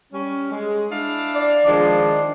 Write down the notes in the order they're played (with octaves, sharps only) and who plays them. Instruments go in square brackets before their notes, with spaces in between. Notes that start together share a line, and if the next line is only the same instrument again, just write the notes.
[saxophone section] G3 C#4
G#3
D4 E4 F5
[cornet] D5
[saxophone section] D#3 F3 G#3 [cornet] D4